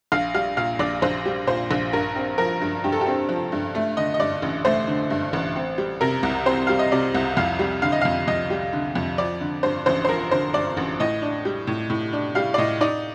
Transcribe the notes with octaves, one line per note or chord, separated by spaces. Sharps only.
A#1 F5
G3 F5
A#2 F5
A#1 D5
A#1 C5
G3
A#2 C5
A#1
G2 A#4
C4
F3 A#4
G2
G2 G4
A4
G4
C4
F3
G2
A3
D3 D#5
D#5
G2 D5
A1
A3 C5
D3
G2
A1
C4
G3
C3 A#4
C2
C4 C5
G3 F5
D#5
C3 D5
C2
F2 F5
G3
D3 F5
D#5
F2 F5
F2 D#5
G3
D3
F2
F3 D5
D3
G2 C5
A1 C5
C5
F3 A#4
D3 C5
G2 D5
A1
A2 D#5
D4
G3
A2
A2
D4
G3 F5
D5
A2 D#5
D#4 D5